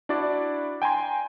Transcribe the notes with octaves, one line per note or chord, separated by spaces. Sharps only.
D4 E4 F#4 D5
G5 G#5 A#5 C6 G#6